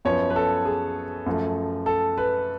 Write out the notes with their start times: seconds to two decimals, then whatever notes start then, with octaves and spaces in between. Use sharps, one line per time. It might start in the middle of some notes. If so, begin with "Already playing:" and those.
0.05 F#2 F3 B3 C#5
0.30 B4
0.36 A4
0.65 G#4
1.26 F#2 F3 A3
1.86 A4
2.18 B4